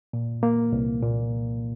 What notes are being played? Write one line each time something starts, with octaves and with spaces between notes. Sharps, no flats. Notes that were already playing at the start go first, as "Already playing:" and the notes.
A#2
A#3
C2
A#2